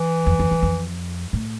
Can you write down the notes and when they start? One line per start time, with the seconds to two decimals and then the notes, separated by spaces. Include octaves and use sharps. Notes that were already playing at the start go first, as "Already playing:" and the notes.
Already playing: E3
0.27 F2
0.39 F2
0.51 F2
0.63 F2
1.33 A2